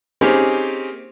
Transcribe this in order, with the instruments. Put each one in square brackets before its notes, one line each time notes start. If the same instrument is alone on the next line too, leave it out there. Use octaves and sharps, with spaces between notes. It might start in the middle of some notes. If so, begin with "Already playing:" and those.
[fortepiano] A#3 C4 C#4 D#4 G4 G#4